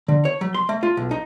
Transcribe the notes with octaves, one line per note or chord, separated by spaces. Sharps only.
D3
C#5
F#3
C6
A3
F4
B1
D#4